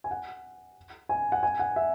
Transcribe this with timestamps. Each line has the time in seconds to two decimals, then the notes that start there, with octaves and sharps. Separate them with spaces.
0.04 G#5
0.11 F#5
1.09 G#5
1.32 F#5
1.43 G#5
1.59 F#5
1.76 E5